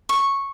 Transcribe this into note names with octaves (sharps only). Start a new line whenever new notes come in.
C#6